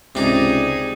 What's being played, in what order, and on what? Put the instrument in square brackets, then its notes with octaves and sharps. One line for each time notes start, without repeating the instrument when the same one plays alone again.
[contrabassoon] C#2 [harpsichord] C3 D5 [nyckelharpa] D#4 G#4